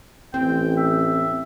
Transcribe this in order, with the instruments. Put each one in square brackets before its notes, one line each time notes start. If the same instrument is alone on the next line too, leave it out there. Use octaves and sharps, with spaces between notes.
[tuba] A1 [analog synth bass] C4 [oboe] G5
[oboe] E5